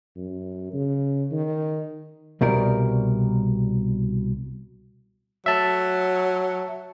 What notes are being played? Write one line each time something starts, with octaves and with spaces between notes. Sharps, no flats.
F#2
C#3
D#3
C2 B2 G3 A#4
F#3 E5 A5